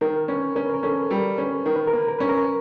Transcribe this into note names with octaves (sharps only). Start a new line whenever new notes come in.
D#3 A#4
C#4 B4
C#4 A#4
B4
A#4
C#4 A4
B4
G3 A#4
C#4 B4
D#3 A#4
B4
A#4
A#3 B4
A#4
C#4 B4
A#4